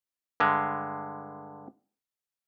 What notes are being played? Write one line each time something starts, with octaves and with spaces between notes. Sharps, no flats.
G2 D3 G#3